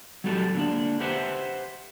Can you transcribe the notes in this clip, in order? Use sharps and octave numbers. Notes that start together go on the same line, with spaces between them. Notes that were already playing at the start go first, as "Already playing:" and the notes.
F#3 A3 F#4 G4 A4
D3 A#3 D4
G4 B4 C5 E5 F#5